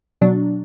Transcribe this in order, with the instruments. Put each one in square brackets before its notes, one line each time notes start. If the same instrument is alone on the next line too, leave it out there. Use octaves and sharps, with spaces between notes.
[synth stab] B2 F#3 D4